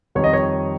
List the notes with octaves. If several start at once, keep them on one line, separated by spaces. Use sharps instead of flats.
F2 D#3 G3 C#5
D#5
C#5